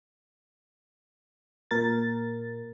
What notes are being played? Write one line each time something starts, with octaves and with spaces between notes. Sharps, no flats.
A#2 A#4 A6